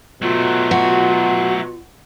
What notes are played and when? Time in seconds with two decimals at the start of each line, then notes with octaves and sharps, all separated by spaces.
0.22 B2 F#3 A3 F4
0.71 F#4